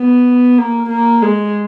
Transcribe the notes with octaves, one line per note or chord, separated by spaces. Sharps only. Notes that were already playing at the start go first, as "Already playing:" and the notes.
Already playing: B3
A#3
A#3
G#3